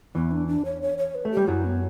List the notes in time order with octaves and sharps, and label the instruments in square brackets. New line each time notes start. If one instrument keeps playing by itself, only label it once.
[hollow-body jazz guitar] E2 E3 [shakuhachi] B3
[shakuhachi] D4
D4
C#5
C#5
C#5
B4
[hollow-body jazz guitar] A3
[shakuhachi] G4
[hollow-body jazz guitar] G3
[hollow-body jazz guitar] F#2 F#3 [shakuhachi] E4
[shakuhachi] B3